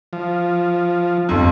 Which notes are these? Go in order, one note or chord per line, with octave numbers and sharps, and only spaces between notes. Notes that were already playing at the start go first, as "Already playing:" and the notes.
F3
G1 F2